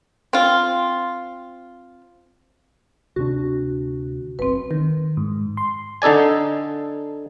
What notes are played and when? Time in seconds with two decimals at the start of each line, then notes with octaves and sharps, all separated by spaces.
0.33 C4 F4
3.16 D2 C3 D4 F#4
4.39 F#1 B1 C4 B4
4.71 D#3
5.17 G#2
5.57 C6
6.02 D3 D#4 A4 D5 G#5